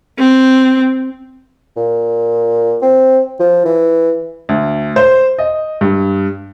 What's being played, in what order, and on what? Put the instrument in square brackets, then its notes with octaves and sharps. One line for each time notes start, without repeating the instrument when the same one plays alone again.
[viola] C4
[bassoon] A#2
C4
F3
E3
[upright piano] D2
C5
D#5
G2